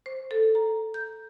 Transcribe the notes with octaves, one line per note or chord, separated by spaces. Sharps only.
C5
A4
A#5
G6